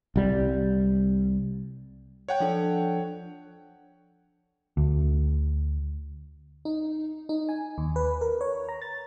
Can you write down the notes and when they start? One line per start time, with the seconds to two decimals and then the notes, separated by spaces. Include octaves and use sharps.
0.16 C2 G3
2.28 C#5 F#5 G5
2.40 F3 D4 A4
4.77 D2
6.65 D#4
7.29 D#4
7.49 G#5
7.78 D#2
7.96 B4
8.21 A#4
8.41 C#5
8.69 A#5
8.82 A6